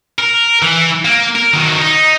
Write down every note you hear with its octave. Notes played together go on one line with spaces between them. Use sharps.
A#4
E3
A#3
A#4
D#3 F#3
D#4